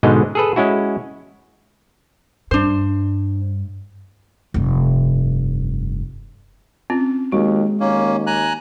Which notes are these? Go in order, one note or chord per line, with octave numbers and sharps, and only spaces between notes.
G#2 B2 D3 G#3 D#5
G#4 A4 B4
G#3 C#4 E4 F#4
G2 D4 C5
F1 G2
C4 C#4 F4
D#2 G#3 F#4
D#2 A#3 C#4
G#5 A#5 F#6